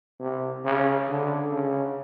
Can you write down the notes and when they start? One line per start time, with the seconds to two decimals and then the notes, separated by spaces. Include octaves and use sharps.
0.20 C3
0.65 C#3
1.09 D3
1.52 C#3